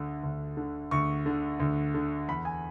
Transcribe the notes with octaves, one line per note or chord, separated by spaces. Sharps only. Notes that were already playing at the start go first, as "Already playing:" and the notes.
Already playing: D2 D3
D2
D3
D2 C#6
D3
D2
D3
E2 B5
G#5